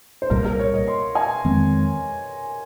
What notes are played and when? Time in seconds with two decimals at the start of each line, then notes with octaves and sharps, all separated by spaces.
0.22 C5
0.30 C2 A#2 G3 A#4
0.45 A#4
0.59 C#5
0.74 D#5
0.88 C6
1.15 G#5
1.45 F2 D#3 G#3 C4